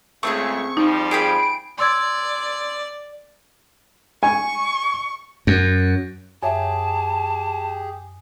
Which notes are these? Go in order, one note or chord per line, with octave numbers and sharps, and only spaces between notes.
C#2 C#3 A3 C4 F4 G#4 C#6
F2 F3 G3 D#4
G#4 G5 B5 D7
D5 C6 E6 G#6
G#5 C#6
F#2
F#2 G4 G#4 C#5 E5 G#5 A5